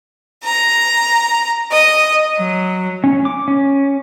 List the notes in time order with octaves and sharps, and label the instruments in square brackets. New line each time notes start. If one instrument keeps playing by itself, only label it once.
[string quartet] A#5
D#5
F#3
[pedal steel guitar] C#4
D6
C#4